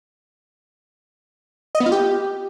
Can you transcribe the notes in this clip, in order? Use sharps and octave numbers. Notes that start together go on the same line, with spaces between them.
D#5
B3
F4
G4